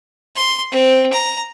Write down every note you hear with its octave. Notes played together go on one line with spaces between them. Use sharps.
C6
C4
A#5